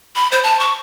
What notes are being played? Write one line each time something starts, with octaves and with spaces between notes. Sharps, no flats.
B5
C5
A5
C#6